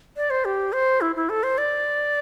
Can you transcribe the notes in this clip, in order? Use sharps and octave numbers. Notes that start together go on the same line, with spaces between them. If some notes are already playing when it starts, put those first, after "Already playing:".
D5
C5
G4
C5
E4
E4
A4
C5
D5